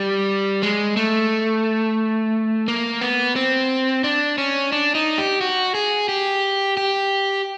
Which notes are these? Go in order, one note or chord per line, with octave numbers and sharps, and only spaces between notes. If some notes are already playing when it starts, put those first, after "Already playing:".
Already playing: G3
G#3
A3
A#3
B3
C4
D4
C#4
D4
D#4
G4
F#4
G#4
G4
G4